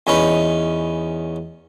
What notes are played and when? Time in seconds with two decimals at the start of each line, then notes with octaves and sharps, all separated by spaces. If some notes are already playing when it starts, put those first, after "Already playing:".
0.07 E2 C#4 D#4 B4